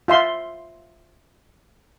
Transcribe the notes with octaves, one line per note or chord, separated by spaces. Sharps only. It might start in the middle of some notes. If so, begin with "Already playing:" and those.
F4 E5 C6